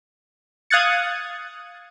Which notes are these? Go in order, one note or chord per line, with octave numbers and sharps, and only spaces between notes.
F5 D#6 F#6 G#6 A6 C#7